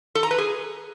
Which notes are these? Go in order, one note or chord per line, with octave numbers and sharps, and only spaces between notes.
A4
A#5
B4
G#4